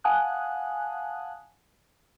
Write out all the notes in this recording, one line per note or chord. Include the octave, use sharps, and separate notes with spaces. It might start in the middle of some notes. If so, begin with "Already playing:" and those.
F5 F#5 G#5 A5 D#6 F#6